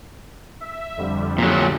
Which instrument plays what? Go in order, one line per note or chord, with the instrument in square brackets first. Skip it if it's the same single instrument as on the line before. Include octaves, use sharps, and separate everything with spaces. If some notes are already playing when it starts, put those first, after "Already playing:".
[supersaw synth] E5
F2 D3 G3
[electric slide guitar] A#2 F#3